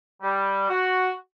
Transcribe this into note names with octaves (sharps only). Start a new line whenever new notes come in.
G3
F#4